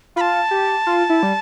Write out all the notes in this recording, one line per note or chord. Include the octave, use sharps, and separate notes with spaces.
F4 A5 B5
G4
F4
E4
G3